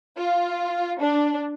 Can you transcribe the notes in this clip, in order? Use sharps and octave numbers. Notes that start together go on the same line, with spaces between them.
F4
D4